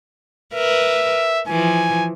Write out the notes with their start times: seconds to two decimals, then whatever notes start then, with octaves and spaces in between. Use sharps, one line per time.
0.54 A#4 B4 E5
1.47 E3 F3 G#5